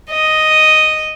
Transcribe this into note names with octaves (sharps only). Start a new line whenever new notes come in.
D#5